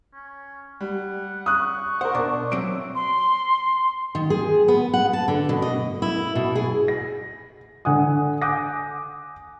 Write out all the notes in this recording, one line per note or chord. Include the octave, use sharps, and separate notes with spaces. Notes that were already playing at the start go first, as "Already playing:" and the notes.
C#4
G3 F#5
C#6 D#6 F#6
A#4 C5 F#5
B2 D4 D6
F#3 C4 E5 D7
C6
D#3
G#4
B3
F#5
A5
D3
B2
D#5
E4
B2
G#4
A#6
D3 F#5 G#5 D#6
G#5 D6 D#6 F#6 G6 A#6